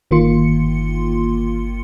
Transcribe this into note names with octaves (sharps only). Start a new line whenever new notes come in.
G1 D#3 A#3 F4 C6 C#7